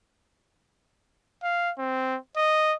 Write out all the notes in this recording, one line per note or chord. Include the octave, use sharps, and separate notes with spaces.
F5
C4
D#5